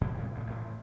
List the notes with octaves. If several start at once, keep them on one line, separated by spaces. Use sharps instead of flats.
F2 B2 G#3
A2 C3 G3 G#3
D2 A2 C#3
A1 A2